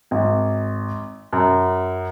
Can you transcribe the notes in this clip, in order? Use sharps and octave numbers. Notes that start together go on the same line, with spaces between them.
G#1
F#2